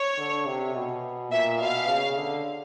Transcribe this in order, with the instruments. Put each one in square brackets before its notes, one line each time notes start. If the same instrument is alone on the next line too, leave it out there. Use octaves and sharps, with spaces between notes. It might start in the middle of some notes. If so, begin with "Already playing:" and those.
Already playing: [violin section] C#5
[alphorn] D3
C3
B2
[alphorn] A#2 [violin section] E5
[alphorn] B2 [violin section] F5
[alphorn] C#3
D3